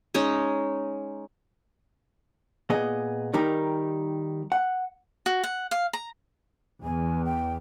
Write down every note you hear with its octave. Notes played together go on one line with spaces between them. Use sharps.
G#3 C#4 D#4
A#2 B3 G#4 D#5
D#3 G3 D#4 G4 A#4
F#5
F#4
F#5
F5
A#5
E2 G#5
G5